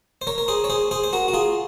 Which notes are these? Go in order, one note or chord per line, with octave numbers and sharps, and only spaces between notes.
C5
A#4 C#5
A#4
G#4 C5
C#5
G#4 C5
G#4 C5
C5
F#4 A#4
F#4
F4 G#4